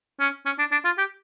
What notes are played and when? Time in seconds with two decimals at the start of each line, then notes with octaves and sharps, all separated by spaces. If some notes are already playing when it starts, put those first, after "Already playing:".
0.20 C#4
0.46 C#4
0.59 D4
0.71 D4
0.85 F4
0.98 G4